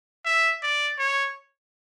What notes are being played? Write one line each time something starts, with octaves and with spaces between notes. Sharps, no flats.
E5
D5
C#5